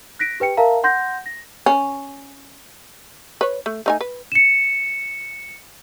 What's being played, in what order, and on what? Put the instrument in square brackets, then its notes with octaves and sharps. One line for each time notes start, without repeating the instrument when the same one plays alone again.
[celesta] F#6 A#6 B6 D7
G4 B4 G5 C#7
A#4 E5 F5 A5 A#5
F#5 C6 G6 A#6
A#6
[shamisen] C#4
B4 C#5
A3
A3 D#4 G#5
B4
[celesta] C#7 E7